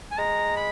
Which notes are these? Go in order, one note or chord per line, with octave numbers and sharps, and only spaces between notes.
G#5
G#3 A#5
B5